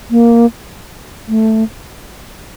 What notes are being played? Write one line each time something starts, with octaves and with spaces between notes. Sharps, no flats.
A#3
A3